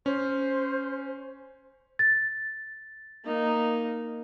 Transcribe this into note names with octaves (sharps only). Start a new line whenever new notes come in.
C#4 C5
A6
A#3 D#4